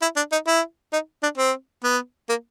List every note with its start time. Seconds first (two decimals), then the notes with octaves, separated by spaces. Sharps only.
0.02 E4
0.16 D4
0.32 D#4
0.47 E4
0.93 D#4
1.23 D4
1.38 C4
1.84 B3
2.29 A#3